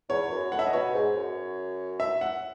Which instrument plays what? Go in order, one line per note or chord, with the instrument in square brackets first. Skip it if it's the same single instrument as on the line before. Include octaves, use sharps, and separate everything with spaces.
[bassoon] E2 [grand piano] C#5
[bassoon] F#2
[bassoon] A2 [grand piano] F#5
[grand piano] E5
D#5
[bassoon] B2 [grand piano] C#5
[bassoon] G#2
F#2
[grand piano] E5
F#5